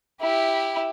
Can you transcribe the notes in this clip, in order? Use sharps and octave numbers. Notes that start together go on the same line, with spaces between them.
E4 G4